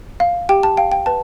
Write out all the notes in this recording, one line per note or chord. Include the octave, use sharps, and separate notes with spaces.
F5
G4 G5
A5
F5 G5
G5
B4 A5